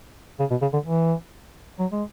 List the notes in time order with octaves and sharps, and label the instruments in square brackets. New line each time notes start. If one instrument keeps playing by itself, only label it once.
[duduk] C#3
B2
C#3
D3
E3
F#3
G#3